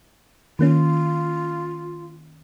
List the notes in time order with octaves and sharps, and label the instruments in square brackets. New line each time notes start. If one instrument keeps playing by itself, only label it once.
[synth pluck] D#3 A#3 C#4 [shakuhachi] F4